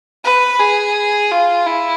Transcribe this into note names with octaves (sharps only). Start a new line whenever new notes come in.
B4
G#4
F4
E4